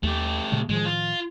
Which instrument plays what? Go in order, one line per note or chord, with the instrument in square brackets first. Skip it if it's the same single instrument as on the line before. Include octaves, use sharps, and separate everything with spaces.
[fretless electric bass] D#2 [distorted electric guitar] A3 G4
[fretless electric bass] A#2 C#3 G#3
[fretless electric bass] A2 D#3 F3 [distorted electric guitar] G#3
[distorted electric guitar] F4